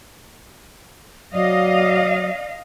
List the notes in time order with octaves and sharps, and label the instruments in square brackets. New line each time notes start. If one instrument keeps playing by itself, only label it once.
[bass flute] F#3 [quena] D5 [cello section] D#5 F5